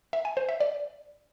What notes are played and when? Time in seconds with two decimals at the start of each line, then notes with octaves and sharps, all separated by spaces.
0.13 E5
0.25 G#5
0.37 C5
0.49 E5
0.60 D5